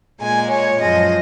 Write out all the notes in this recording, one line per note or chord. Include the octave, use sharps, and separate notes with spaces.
A#2 G#3 G#5
C#5
F#2 F3 G#3 D#5